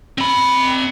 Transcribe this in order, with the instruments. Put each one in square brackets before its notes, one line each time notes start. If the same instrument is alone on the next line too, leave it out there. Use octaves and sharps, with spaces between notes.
[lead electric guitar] C4 B5